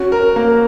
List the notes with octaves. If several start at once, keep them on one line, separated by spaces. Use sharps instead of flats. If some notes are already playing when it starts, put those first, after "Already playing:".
Already playing: C#4 F#4
A#4
A#3